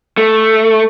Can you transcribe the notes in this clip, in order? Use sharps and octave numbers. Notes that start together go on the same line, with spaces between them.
A3